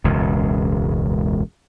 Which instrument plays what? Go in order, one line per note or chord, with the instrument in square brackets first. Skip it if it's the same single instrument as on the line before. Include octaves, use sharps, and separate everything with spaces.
[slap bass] E1 C#2 F#2